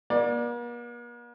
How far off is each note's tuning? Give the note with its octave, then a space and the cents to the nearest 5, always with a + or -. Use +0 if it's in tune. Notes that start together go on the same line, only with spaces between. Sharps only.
A#3 +45 D5 +15